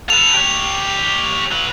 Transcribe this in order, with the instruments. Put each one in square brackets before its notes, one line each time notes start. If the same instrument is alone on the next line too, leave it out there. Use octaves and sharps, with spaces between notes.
[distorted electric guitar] A4 B4 [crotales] F7
[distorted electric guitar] G4 C#5
F#3 B4